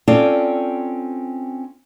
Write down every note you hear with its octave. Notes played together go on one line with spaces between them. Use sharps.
C4 C#4 F4 A4 D5